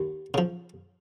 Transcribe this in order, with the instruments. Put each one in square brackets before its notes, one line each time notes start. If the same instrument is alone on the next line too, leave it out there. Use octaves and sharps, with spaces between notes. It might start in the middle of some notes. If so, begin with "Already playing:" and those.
Already playing: [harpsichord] D#2
C#3 F3